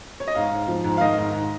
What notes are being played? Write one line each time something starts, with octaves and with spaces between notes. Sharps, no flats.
C#5
D#5
G#2 F5
G#2
F3
G#2
F5
D#3 D#5
G#2
G#2